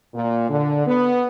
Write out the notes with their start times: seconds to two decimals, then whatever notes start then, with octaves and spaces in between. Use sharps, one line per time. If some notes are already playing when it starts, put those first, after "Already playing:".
0.14 A#2
0.49 D3
0.87 B3